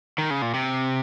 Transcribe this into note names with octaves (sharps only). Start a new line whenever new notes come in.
D#3
C#3
A#2
C3